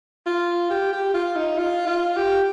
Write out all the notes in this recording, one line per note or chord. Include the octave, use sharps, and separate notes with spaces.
F4
G4
G4
F4
D#4
F4
F4
G4